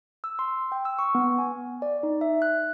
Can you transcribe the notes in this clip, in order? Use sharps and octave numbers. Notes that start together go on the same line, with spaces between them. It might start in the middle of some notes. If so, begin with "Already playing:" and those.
E6
C6
G5
E6
C#6
B3
G#5
D5
D#4
E5
F#6